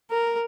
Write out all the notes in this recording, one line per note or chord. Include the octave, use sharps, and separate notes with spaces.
A#4